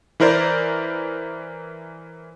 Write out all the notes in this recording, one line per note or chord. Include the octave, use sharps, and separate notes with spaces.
E3 E4 A#4 C5 D5